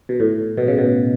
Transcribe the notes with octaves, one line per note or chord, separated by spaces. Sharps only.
B2
A2
B2
C#3
B2